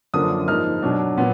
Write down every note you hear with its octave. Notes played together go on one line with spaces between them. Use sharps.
F#2 D3 F3 A#3 D4 D#6
G#2 F3 A#3 D#4 F6
B2 F#3 D4
A#2 F#3 B3